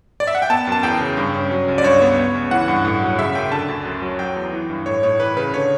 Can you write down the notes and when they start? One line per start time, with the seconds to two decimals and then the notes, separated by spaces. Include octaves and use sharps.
0.20 D5
0.27 E5
0.35 F#5
0.42 G5
0.50 B3 A5
0.67 F#2 A5
0.83 E2 G5
1.00 C#3
1.17 G2
1.35 C#4
1.51 F#3
1.68 C#2
1.78 D5
1.84 G2 C#5
2.02 B3
2.18 B3
2.35 C#2
2.51 E3 F#5
2.68 G2
2.85 A2
3.02 F#3
3.19 C#3 E5
3.35 F#2 G5
3.52 D3 A5
3.69 D2
3.85 F#2
4.02 F#3
4.19 F#3 G5
4.36 E2
4.53 E3
4.70 G2
4.86 A2 C#5
5.03 A2 C#5
5.20 E3 B4
5.37 C#3 B4
5.54 D3 C#5